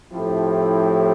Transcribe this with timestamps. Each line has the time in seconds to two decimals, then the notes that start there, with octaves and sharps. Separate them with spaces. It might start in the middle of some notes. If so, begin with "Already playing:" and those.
0.12 A2 F3 C4 E4 G4